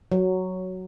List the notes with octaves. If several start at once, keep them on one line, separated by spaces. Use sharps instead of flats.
F#3